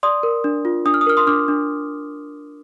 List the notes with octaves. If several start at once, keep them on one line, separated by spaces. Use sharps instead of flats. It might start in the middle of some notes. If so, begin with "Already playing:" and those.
D5 C6 D#6
A#4
D4
F4
D4 D#6
F6
D#6
A#4 F6
C6 D#6
D4 D6 F6
D4